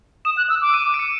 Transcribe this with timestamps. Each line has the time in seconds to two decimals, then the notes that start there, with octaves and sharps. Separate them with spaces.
0.25 D#6 E7
0.37 F#6
0.50 E6
0.61 D6
0.74 D#7
0.94 D7
0.99 C#7